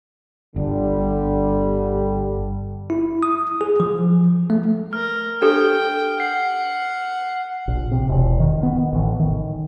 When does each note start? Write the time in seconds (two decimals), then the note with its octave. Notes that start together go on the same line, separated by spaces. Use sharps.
0.56 G1 D3 G3
2.90 E4
3.23 D#6
3.61 G#4
3.80 F3
4.50 A3
4.93 A#4 F6
5.42 D4 G4 A4 G5
6.20 F#5 C7
7.68 A#1
7.91 C3
8.09 E1
8.40 D#3
8.63 B3
8.75 D#3
8.93 A1
9.20 D#3